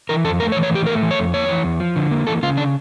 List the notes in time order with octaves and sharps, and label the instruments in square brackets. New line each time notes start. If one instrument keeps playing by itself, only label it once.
[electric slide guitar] E3 A#4
F2 A4
A3 A#4
C#5
E3
C#5
A2 G4
A3 A#4
E3
C#5
F2
A#3 C#5
E3
E2
F3
D3
A#3
E3 A4
C#3 F4
D4